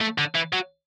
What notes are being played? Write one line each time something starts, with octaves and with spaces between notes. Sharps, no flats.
A3
D3
E3
F#3